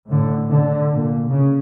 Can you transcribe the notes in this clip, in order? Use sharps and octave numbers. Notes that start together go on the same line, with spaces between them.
A2 D3
D3
A#2
C#3